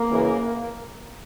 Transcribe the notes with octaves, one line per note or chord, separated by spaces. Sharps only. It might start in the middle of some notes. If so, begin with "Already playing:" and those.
Already playing: A#3
F#2 C#3 E3